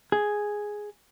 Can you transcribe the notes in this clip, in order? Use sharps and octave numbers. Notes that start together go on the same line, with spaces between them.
G#4